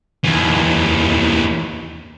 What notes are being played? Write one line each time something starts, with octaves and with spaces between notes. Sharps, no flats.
D#2 E3